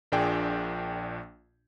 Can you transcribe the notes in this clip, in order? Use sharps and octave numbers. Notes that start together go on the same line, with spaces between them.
A#1 A#2 D4 G#4 G5